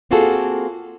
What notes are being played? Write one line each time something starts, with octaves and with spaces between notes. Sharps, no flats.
A#3 C4 F4 F#4 G#4 A4